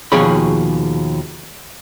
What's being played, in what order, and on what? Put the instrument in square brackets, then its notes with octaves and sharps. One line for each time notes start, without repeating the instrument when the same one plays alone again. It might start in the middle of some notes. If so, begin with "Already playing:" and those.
[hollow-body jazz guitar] D#2 B2 F3 G#4 C#5 B5